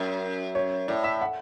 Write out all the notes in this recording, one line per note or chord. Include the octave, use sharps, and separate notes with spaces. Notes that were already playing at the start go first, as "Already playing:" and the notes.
Already playing: F#2
C#5
A2 D5
E5
F#5